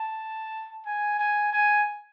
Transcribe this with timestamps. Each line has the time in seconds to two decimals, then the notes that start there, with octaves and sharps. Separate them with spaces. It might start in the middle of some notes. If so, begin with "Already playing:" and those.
Already playing: A5
0.86 G#5
1.19 G#5
1.53 G#5